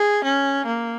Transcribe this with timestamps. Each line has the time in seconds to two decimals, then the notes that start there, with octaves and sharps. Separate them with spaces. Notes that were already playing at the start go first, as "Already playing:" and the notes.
Already playing: G#4
0.24 C#4
0.66 A#3